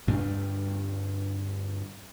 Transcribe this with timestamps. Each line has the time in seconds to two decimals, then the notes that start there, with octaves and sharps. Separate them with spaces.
0.07 D2 G2 G3 D4